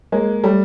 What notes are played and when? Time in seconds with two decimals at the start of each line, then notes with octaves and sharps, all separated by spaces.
0.12 G#3 A#3
0.43 G3 A3